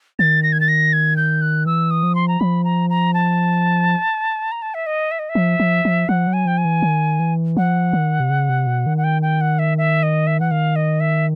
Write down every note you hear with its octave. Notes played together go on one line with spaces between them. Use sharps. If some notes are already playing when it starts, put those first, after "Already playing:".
D#3 A6
A#6
G#6
A6
A#6
G#6
G6
F#6
E3 E6
D#6
F3
C6
A#5
F3 B5
A#5
A#5
A5
A#5
A5
E5
D#5
E5
D#5
E5
F3
F3
F3
F3 F#5
F#3
G#5
F3 G5
G#5
E3
D#3
E3
F3 F#5
D#3
C3
C#3
C3
B2
D#3
F#5
G5
G5
F#5
E5
E5
D#5
E5
E3 F#5
D#3 F5
D#5
E5